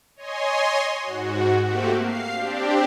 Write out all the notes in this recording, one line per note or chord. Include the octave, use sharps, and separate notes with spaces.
C#5 D#5 G#5 C6
G#2 F#4
A3 A#3 C4 F#4 G4
F5 C7
C4 D4 G4